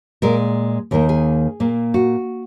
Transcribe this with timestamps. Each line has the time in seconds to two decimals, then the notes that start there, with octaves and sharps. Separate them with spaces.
0.22 A#2 G#3 A#4
0.91 D#2 D#3 A#3 A#4
1.09 G#4
1.60 A#2 A#3
1.94 F#4